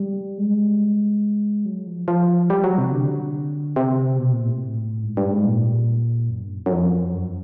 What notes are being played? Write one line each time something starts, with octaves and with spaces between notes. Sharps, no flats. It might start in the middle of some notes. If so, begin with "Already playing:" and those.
Already playing: G3
G#3
F#3
F3
F3
G3
F#3
C3
D3
C3
B2
A#2
A2
G#2
G2
G#2
A#2
F#2
G2
F#2
F#2
F2
F#2